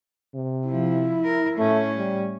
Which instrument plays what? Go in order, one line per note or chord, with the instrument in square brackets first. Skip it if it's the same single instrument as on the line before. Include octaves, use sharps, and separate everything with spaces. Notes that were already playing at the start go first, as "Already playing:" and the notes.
[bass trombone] C3
[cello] F3 [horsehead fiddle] E4
[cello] A#4
[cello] A2 C#4 [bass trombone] A3
[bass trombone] G3